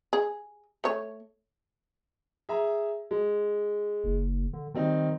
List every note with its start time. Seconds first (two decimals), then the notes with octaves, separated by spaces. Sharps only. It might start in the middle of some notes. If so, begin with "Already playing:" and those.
0.13 G#4
0.84 A3 C#5
2.49 G#4 E5 A#5
3.11 G#3
4.04 F#1
4.53 D3
4.74 D#3 G3 C4 D#4